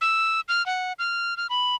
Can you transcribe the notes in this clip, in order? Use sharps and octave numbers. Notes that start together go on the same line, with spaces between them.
E6
F6
F#5
F6
F6
B5